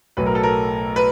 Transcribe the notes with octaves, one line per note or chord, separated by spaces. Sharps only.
B1 A2 F#3 B4
A#4
A4
A#4
B4